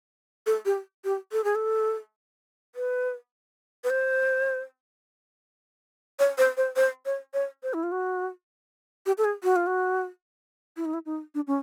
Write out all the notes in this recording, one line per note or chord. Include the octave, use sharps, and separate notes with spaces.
A4
G4
G4
A4
G#4
A4
B4
B4
C5
C#5
C5
C5
C5
C#5
C#5
C5
E4
F4
F#4
G4
A4
G#4
F#4
F4
F#4
E4
D#4
E4
D#4
D4
C#4